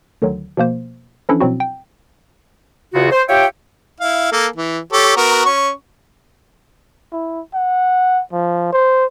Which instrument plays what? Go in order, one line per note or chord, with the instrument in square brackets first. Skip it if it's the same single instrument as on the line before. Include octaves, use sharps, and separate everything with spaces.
[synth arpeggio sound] D2 D3 D#3 F#3
B2 F3 A#3 C5
E3 F3 C#4 D4 E4 A4
B2 F3 F#3 C4 E4 F#4
G5
[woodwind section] E2 C#3 F4 F#4
C5
F4 G4 C#5 E5 G5
[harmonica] E4 F5
A#3 A4
E3
G4 A4 C#5
B3 F#4 A#4
C#4 C#6
[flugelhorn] E4
F#5
F3
C5